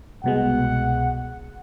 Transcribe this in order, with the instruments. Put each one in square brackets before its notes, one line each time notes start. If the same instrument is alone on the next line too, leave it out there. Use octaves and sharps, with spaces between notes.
[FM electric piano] C2 B2 G#3 [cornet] F#5